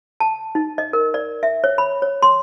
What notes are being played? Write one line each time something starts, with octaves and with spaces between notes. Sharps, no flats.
A5
D#4
D#5
A#4
D5
E5
C#5
B5
C#5
C6